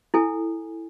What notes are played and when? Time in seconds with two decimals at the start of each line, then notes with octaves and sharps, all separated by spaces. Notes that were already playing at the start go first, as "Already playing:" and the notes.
0.14 E4 A4 G#5